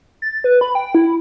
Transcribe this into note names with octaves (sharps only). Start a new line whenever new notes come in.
A6
B4
B5
G5
E4